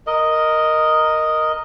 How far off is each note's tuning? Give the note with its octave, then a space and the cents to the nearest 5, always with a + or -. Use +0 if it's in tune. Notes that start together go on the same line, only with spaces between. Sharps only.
A#4 +0 D#5 +0